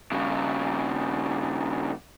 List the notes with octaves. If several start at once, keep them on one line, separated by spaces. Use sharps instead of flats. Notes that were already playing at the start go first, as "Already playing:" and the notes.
G2 C#3